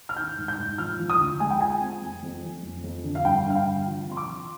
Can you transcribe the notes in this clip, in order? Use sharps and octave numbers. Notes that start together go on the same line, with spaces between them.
F6
D#3 G6
G#2
G6
G#2
F3 F6
F3
D#6
D2
G#3 G#5
G5
F4 G#5
C4
F2
F2
F2
F2
F2
D3
F5
G2 G5
G2 F5
G5
D3
F3
C4 C6
D6
F3